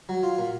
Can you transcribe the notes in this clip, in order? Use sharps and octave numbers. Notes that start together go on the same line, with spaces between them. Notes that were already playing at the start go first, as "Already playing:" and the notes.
F#3
F4
A#2